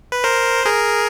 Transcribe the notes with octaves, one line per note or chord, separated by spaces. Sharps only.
B4
A#4 C5
G#4 A#4